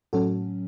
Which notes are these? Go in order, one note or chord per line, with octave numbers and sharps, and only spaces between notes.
A2 F#3 C#4 F#4 A4